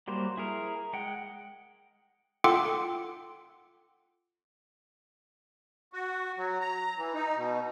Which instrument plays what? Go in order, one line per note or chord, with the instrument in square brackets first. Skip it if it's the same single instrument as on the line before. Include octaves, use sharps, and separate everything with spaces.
[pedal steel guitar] F#3 G3 A#3 C5
E4 G#4 A#4
G#3 F#5 G5
[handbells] F4 A4 F#5 G5 C6 D6
[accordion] F#4
F#3
A#5
E3
D#4
B2